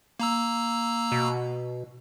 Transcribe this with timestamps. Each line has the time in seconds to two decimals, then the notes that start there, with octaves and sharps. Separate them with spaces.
0.20 A#3 A#5 E6
1.12 B2